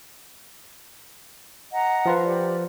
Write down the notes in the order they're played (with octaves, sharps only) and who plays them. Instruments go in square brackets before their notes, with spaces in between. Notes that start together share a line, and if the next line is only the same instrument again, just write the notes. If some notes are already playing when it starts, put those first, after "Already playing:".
[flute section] D#5 F#5 A#5
[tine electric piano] F3 F4 B4
[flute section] G4 D5